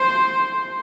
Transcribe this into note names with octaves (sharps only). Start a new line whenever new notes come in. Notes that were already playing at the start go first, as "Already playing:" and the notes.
Already playing: C5